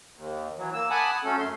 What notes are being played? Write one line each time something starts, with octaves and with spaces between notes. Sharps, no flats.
D#2
E3 F#3
A#3 E6
F#5 G#5 A5 B5 D6 D#6
F#3 A3 C#4 A4
F#2 A3 C6